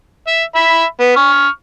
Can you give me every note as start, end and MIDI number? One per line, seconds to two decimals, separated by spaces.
0.27 0.44 76
0.55 0.85 76
0.55 0.85 83
1.00 1.15 59
1.16 1.48 85
1.16 1.48 89